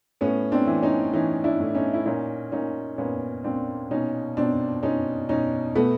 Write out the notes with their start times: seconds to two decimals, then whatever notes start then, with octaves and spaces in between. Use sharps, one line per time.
0.21 A2 B3 C#4
0.52 C4 D4
0.67 E3
0.83 C#4 D#4
1.13 E3 C#4 D#4
1.44 D4 E4
1.59 A2
1.75 C#4 D#4
1.94 E4
2.06 A#2 C#4 D#4
2.52 A#2 C#4 D#4
2.98 A#2 B3 C#4
3.44 A#2 C4 D4
3.91 B2 C#4 D#4
4.37 B2 C4 D4
4.83 B2 C#4 D#4
5.29 B2 C#4 D#4
5.75 B2 A3 B3